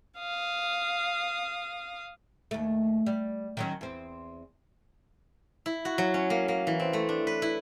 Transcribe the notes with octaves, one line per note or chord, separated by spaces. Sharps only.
F5 D#6
D#2 A3
G3
D#3 F#3 C#4
E2 C4
E4
F#4
F#3
C#4
A#3
A#3
E3
C4
A3
D4
B4
E4